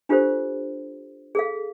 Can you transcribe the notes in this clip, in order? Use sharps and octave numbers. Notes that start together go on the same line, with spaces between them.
D4 F4 G4 A4 C5
G#4 A4 F5